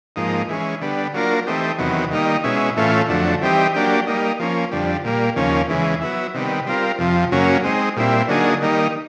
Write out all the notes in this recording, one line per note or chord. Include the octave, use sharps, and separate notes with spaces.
G#2 F3 A#3 D#4
E3 G#3 C#4
D3 G3 B3
F#3 A#3 D4 F4 A#4
E3 A3 C4 D#4 G4
E2 C3 D#3 F#3 B3
D#3 G3 A#3 D#4
B2 G#3 C#4 E4
A2 E3 A3 C#4 F4
F2 D3 F#3 A3
E3 G3 C4 D#4 G4
F#3 A#3 D4 G4
G3 A#3 D#4
F3 A#3 C#4
F2 D3 G3
A#2 G3 A#3
D#2 C#3 F3 A#3 C#4
E2 C#3 E3 G#3
F#3 B3 E4
C3 D#3 G3 B3
G3 C4 F4 A#4
F2 C3 F3
F#2 C#3 F#3 A#3 C#4
G#3 C4 D#4
A#2 G3 C4 E4
D3 F#3 A#3 D#4 G#4
D#3 G3 A#3 D#4